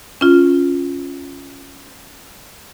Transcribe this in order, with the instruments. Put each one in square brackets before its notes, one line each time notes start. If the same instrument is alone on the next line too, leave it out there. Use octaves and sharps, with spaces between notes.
[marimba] C#4 F4